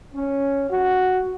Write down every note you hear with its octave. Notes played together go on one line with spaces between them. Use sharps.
C#4
F#4